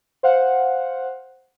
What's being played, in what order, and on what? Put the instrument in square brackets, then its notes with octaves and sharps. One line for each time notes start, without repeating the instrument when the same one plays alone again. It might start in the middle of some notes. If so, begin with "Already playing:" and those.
[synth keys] C5 F5 F#5